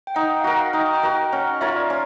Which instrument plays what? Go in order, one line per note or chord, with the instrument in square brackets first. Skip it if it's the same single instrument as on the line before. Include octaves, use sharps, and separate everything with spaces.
[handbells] G5
[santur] D#4 [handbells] F#5
[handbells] G5
F5
[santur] F#4 A#4 [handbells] F#5
[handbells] F5
[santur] D#4 [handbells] G5
[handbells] G5
[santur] F#4 A#4
[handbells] G5
[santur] C#4 [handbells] F#5
[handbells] D#5
[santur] F4 A#4 C#5 [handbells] E5
[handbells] D5
[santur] C#4